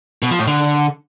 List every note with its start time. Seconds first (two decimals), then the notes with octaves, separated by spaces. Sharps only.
0.22 B2
0.31 F3
0.39 A2
0.47 D3